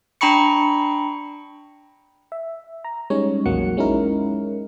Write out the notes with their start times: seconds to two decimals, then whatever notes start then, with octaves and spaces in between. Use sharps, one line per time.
0.21 D4 G5 A#5 B5 C#6 C#7
2.32 E5
2.85 A#5
3.10 G3 G#3 C#4 D#4 C#5
3.46 A#1 E2 F#3 A#3 F#5 C#7
3.77 G#3 C#4 D#4 E4 A#4